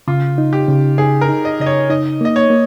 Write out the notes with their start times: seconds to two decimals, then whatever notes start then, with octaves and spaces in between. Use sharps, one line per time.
0.08 C#3 F4
0.38 D#4
0.53 G4
0.68 C#3
0.98 D#4 G#4
1.21 A#4
1.29 D#4
1.45 D#5
1.60 C#3 D#5
1.66 C#5
1.90 D#4 D#5
2.21 A#3 D#5
2.36 C#5
2.50 A#3